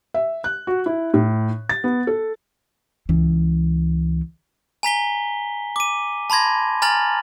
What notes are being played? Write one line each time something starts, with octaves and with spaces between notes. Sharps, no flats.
E5
F#6
F#4
E4
A2
A6
B3
A4
C#2 E3
G#5 A#5 B6 G7
D6 D#7
A5 B5 C6 G#6 A#6
G#5 A#5 F6 A6 F#7